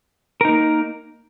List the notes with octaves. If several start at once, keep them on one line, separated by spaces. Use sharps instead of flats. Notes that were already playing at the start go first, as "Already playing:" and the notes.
A#3 D#4 A#4